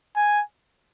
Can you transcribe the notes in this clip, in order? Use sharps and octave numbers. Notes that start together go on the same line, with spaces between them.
G#5